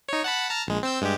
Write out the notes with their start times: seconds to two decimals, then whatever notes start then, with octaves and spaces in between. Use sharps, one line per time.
0.09 D#4 C#5
0.24 F#5 A5 B5
0.49 A5 A#5 F6
0.67 A#1 G#3
0.83 C4 E6 G6
1.01 G2 G#3 G4